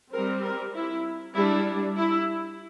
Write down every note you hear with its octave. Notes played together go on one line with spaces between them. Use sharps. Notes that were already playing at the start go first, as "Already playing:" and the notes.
G3 C4 A#4
A#4
E4
G3 D4 E4
E4